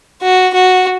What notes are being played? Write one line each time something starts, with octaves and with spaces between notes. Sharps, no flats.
F#4
F#4